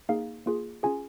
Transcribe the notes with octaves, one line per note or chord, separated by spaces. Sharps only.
A#3 D#4 G#4 F5
A#3 F4 G#4
C#4 F4 G#4 G#5